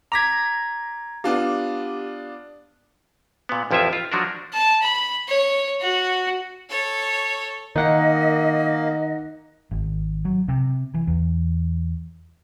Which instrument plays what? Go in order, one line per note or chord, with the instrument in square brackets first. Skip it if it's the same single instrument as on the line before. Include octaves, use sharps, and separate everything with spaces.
[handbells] A#5 G#6 [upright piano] D6 A#6 B6
[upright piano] B3 D4 F4 [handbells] G4
[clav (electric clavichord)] A#2 B3
A1 F2 F3 E4 F4 E5
F4
F3 F#3 D4 F#4 A#4
[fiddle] A5
B5
C#5
F#4
A4 C#5
[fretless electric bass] D#3 [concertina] A#3 [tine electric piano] D#4 F#5 [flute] D#5
[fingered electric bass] G#1
F#3
C3
E3
E2